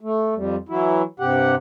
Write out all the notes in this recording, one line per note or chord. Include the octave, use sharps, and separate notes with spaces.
A3
F2 G3
E3 F#3 E4
G2 C3 G4 F#5